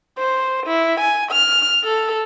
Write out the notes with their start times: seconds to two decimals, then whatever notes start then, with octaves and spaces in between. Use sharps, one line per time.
0.19 C5
0.67 E4
1.00 G#5
1.32 F6
1.84 A4